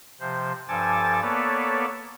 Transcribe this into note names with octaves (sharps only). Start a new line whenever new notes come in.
C3 F3 C5
G2 F3 A4 G#5 D6 A6
A#3 B3 A4 B4 C#5 D5